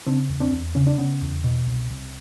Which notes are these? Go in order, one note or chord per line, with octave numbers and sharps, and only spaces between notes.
C#3 C4 D4
E2
C4 D4
E2
C#3 C#4
D4
C#3 B3 C#4
E2
B2
C2
C2